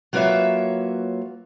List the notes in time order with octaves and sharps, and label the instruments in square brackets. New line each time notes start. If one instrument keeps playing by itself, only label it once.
[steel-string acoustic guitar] F#3 A#3 F4 B4 C#5 E5